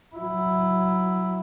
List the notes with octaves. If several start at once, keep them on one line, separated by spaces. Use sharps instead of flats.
F#3 E4